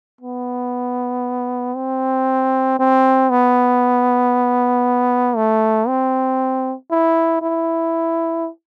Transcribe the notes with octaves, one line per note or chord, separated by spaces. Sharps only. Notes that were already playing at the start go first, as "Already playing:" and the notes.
B3
C4
C4
B3
A3
C4
E4
E4